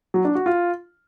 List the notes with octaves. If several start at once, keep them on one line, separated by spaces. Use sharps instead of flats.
F#3
D4
F#4
F4